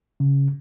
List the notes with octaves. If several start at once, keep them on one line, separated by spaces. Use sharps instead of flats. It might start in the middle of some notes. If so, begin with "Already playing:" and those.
C#3